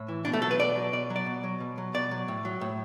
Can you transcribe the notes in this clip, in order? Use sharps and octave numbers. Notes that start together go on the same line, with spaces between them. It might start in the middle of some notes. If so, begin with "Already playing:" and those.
Already playing: A2
E3
B2 D4
A3
F#3 A4
B4
B2 D5
F#3
B2 D5
F#3
D5
B2
F#3
B2
F#3
B2 D5
F#3
A2
F#3
A2